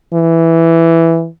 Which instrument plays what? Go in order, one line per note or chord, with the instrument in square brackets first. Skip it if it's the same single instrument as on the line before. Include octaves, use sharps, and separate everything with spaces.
[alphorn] E3